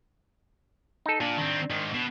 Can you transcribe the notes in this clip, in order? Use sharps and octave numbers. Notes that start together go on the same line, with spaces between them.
D#4 A4
A#2 D4
D#3 C4
G#2 D#3
B2